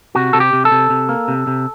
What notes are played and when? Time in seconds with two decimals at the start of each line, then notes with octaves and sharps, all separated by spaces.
0.15 C3 F#4
0.33 C3 A4
0.40 G4
0.53 C3
0.65 A4
0.71 C3
0.90 C3
1.09 A#3
1.28 C3
1.47 C3